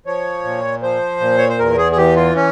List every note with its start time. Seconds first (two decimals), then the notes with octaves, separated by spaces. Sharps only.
0.06 F3 C#5
0.44 A#2
0.82 F3 C5
1.20 A#2
1.38 C#5
1.49 C5
1.59 E2 A#4
1.78 G#4
1.92 G#4
1.97 E3 G4
2.16 F4
2.36 C#4